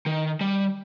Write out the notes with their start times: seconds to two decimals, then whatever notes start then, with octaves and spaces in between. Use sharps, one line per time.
0.06 D#3
0.41 G3